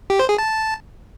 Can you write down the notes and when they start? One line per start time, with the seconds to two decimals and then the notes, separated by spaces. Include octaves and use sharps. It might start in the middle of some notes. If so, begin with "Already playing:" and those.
0.10 G4
0.19 C5
0.29 G#4
0.38 A5